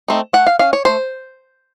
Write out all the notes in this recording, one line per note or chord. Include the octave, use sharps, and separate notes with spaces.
A3 C4 D#4
A3 F#5
F5
C#4 F5
C#5
A3 C5